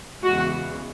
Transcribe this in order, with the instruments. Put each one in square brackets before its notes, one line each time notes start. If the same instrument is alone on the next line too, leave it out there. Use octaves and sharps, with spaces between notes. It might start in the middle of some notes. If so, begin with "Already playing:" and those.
[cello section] E2 C#3 E3 G#3 F#4